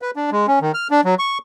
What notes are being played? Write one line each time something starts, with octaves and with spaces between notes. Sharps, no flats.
B4
D4
G#3
C#4
D#3
F6
D4
F#3
C#6